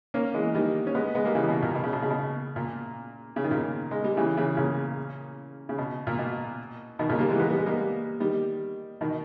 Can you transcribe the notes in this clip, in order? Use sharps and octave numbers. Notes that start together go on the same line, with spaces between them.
A#3 C#4
E3 G#3
D#3 G3
C#4
G#3 B3
G#3 B3
G3 A#3
C#3 E3
B2
A#2
B2
C#3
B2
C#3
B2
A#2
C#3
D#3
A#2 C#3
G#3
G3
C#3 E3
C#3 E3
A#2 C#3
C#3
B2
A#2
B2
B2 D#3
A#2 C#3
G3 A#3
E3 G#3
G#3 B3
G3
G#3
G3 A#3
D#3 G3
B2 D#3